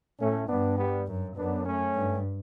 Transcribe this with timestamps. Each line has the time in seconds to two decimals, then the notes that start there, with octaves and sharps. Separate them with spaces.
0.19 A2 A3 C#4
0.48 G2 B3 D4
0.78 G3 B3
1.07 F#2
1.36 F#2 B3 D4
1.66 A3 C#4
1.95 G2